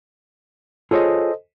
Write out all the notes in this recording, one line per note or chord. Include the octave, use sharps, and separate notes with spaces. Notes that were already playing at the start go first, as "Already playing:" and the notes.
F4 G#4 A4 C5 C#5 D#5